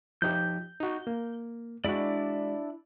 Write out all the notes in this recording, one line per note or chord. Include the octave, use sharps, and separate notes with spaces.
F3 D#4 G4 G6
D#4 F#4
A#3
G#3 D4 E4 F#4 D5